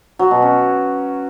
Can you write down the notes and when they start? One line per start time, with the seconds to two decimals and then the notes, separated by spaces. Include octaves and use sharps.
0.19 F#3
0.31 B2
0.42 C#4